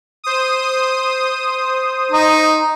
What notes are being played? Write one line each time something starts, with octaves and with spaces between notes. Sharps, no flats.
C5 D#6
D#4